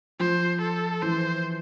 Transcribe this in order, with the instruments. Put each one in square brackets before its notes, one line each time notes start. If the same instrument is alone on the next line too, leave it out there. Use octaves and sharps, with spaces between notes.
[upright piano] F3 [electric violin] C5
[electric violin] A4
[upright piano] E3 [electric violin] C5